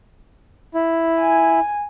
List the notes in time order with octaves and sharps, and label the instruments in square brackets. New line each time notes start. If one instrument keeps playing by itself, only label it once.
[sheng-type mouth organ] E4
[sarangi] G#5